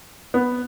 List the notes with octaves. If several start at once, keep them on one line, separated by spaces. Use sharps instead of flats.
B3